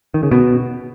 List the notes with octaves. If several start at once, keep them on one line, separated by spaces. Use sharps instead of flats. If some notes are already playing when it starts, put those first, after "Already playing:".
D#3
C#3
B2